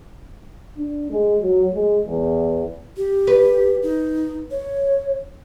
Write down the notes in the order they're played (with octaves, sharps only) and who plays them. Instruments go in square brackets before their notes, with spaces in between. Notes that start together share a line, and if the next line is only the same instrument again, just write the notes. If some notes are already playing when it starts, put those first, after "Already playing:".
[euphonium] D4
G#3
F#3
G#3
E2
[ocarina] G4
[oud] B4
[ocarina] D#4
C#5